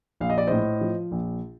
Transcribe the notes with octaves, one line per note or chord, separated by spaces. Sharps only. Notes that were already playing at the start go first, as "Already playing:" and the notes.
A#1 F5
D#5
D5
A2 C5 D#5
F3
A#1